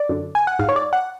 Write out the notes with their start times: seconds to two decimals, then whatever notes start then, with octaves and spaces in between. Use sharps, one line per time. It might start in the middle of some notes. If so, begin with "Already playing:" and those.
Already playing: D5
0.09 F#2 D3
0.35 G#5
0.47 F#5
0.59 G#2 F5
0.69 C#5
0.76 D5
0.93 F#5